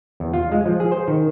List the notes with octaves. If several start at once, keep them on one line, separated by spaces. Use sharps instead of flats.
E2
F4
G#3
F3
G#4
C5
D#3